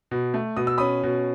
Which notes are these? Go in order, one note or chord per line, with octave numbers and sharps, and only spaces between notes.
B2
A3
B2 D#6
E6
C#4 B5 D#6
B2